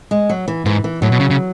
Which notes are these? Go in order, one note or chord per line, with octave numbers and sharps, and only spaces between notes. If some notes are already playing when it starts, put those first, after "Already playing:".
G#3
F#3
E3
G#2 E3
E3
A2 F#3
B2
C#3
C#3